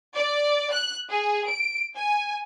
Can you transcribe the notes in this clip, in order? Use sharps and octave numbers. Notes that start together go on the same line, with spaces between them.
D5
F#6
G#4
D7
G#5